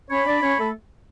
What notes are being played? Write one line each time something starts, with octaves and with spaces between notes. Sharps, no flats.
C#4 C#5 B5
D4 D5
C#4 C#5
A3 A4